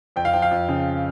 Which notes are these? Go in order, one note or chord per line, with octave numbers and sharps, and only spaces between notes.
F2 G5
F5
F3 G5
F5
F2
C#3